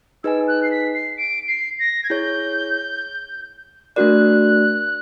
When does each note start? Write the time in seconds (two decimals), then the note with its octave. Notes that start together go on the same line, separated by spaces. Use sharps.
0.23 D#4 G#4 B4 D#5 G#5 E6
0.47 F#6
0.63 C7
0.71 B6
0.94 C7
1.17 D7
1.47 C7
1.79 A#6
2.03 G#6
2.10 E4 G#4 C#5 G6
3.96 A3 D4 F#4 A#4 D5 F#6